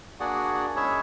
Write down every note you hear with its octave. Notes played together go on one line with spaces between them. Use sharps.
A#3 D4 F#4 G#4 D5 F#5
G#3 C#4 E4 G#4 C#5 E5